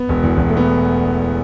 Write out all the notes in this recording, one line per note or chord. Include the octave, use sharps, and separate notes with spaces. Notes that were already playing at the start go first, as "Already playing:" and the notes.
Already playing: B3
E1
E2
E1
A3
B3